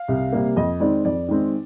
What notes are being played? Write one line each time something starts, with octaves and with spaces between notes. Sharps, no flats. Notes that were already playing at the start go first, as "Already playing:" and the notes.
Already playing: F5
C2
C3 G3 A#3
F2 D#5
D#3 G#3 C4 D5
F2 D5
D#3 G#3 C4